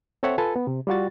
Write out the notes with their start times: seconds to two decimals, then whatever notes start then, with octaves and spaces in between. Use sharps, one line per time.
0.23 C4 A4 C#5 E5 F#5
0.38 F4 A4 B4 G#5 A5
0.56 B3
0.67 C3
0.87 G3 F4 F#4 A6